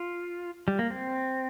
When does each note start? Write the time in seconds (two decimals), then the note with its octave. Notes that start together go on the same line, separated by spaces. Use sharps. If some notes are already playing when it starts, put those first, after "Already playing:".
Already playing: F4
0.68 G3
0.79 A#3
0.90 C4